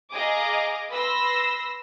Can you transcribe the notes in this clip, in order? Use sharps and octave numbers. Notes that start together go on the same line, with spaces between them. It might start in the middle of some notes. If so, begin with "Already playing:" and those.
G#4 D#5 F5 A#5 D6 D#6
B4 B5 C6 E6 A#6